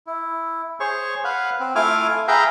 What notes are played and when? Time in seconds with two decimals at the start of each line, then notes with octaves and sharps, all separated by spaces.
0.07 E4
0.80 G#4 C5 C#5 C#6
1.24 B4 F5 F#5
1.60 C4
1.75 A3 E4 F4 G#5 D6 F6
2.28 G#4 B4 E5 F5 G5 A#5